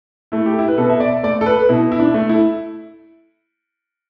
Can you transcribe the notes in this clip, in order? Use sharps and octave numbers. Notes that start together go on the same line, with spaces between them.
A3 E4
G4
E4
B4
B2 A4
E5
D5
A3 D5
A4
B4
B2 E4
E4
D4
A3
E4